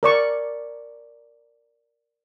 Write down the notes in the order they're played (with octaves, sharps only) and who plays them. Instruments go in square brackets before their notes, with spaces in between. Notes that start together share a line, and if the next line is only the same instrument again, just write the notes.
[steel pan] A#4 D5 C#6